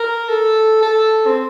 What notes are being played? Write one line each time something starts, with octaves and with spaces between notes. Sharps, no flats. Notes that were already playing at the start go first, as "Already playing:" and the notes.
Already playing: A#4
A4
A4
C4